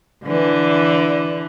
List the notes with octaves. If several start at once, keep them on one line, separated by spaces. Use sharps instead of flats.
D3 E3